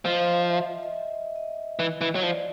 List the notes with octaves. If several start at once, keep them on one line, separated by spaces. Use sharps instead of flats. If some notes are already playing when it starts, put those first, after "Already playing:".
F3 D#5
E5
D#5
E5
D#5
E3 D#5
E3
F#3 D#5
F3 D5